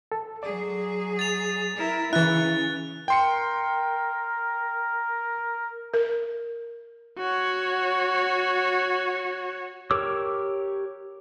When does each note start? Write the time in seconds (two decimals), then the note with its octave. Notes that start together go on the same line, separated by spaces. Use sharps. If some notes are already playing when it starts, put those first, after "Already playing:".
0.12 A4
0.43 F#3 G#4 D5
1.19 A6 F7
1.76 E4 A#4
2.13 C#3 E3 C#4 E4 F#6 A6
3.08 A#4 G5 C6 C#7
5.94 A#4
7.19 F#4 C#5
9.91 G4 A#4 C#5 D6 E6